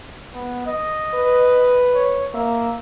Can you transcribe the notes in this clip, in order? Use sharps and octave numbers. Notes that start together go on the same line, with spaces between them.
B3
D#5
B4
C#5
A#3 E5